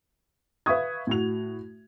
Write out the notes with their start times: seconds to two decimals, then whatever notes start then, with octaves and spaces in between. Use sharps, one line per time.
0.66 B4 E5 F5 C#6 D#6 G#6
1.07 A2 F#4 F7